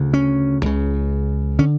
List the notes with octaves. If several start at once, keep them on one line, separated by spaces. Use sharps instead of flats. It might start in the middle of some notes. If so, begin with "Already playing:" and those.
Already playing: D2 C#3
C#4
C#2 C#3
D3 C#4